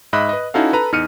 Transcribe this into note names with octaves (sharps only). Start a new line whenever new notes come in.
G#2 D#5 E5 B5 F#6
B4 D#5
C#4 D#4 E4 F#4 A4 F5
A4 B4 A#5
E2 D#4 F6 C#7 D#7